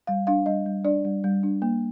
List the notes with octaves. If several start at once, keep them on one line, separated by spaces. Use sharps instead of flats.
G3 F5
D4 F5
G3 D#5
G3
D4 D5
G3
G3
D4
A#3